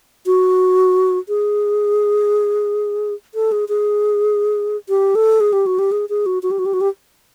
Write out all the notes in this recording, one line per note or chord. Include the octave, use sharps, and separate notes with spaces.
F#4
G#4
A4
G#4
G#4
G4
A4
G#4
G4
F#4
G4
G#4
G#4
F#4
F#4
G4
F#4
G4
F#4
G4